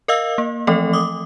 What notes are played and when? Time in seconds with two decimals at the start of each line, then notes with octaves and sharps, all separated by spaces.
0.08 A#4 D#5 F5 E6
0.38 A#3
0.67 E3 F3 A3 C4 A4 D#5
0.93 D6 D#6